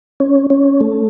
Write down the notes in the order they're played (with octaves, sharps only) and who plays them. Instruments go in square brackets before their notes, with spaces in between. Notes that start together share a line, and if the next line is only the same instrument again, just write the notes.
[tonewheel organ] C#4
C#4
A3